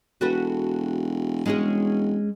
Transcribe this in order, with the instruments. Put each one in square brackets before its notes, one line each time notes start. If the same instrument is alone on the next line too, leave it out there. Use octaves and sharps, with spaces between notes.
[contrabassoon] E1 [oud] F#4 A4 B4
[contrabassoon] E1 [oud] G#3 C#4 G#4